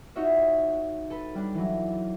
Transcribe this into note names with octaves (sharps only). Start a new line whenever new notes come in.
D#4 F4 F#4 C#5 E5
A4 B4
G3 D4
E3 F#3